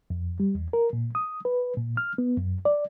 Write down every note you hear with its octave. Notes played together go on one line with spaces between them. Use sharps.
F2
G3
E2
A#4
A#2
D#6
B4
A#2
F6
B3
F#2
D5